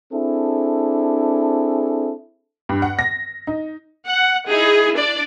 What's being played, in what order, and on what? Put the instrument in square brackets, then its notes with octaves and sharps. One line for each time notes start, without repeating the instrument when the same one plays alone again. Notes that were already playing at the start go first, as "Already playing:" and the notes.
[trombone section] C4 D4 E4 G#4 A4
[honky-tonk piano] G2
F#5
A#6
D#4
[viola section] F#5
D#4 E4 G#4
D4 D5